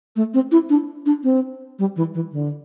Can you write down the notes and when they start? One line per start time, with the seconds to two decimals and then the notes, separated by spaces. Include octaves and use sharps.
0.16 A3
0.34 C4
0.52 E4
0.70 D4
1.06 D4
1.24 C4
1.79 G3
1.96 E3
2.14 E3
2.32 D3